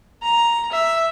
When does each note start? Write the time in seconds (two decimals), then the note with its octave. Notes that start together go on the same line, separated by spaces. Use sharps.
0.22 A#5
0.72 E5